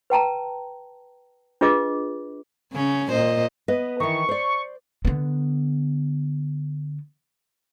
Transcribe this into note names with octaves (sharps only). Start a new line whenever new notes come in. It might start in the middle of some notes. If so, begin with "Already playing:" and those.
B4 G5 A5 A#5
D4 F4 G#4 B4 D#5 D6
C#3 C#4
A#2 C5 D#5
B3 B4 D#5
D#3 E3 C#6
C5 D5
D3 B3